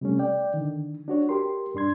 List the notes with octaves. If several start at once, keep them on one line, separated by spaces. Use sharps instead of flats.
C3 G3 A3 C#4
D5 G5
D3 D#3
D4 F#4 C#5
G4 A#4 C6
G2 D4 C6 G#6